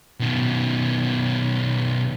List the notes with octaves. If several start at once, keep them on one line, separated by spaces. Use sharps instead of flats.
B2 D#3